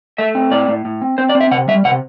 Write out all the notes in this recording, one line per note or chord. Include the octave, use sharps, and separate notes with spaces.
A3 E5
C4
A2 D5
A2
A2
C4
C4 C5
D5
C4
E5
C3 F#5
G3 E5
C3 F#5